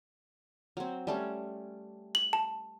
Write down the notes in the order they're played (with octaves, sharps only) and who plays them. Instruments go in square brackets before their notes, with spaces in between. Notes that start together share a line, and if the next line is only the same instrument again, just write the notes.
[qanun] F#3 C4
G3 A3 C#4
[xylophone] F#7
A5